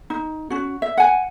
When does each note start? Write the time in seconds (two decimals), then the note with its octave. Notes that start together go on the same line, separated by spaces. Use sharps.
0.10 D#4
0.50 C#4 F#4
0.82 E5
0.97 F#5 G#5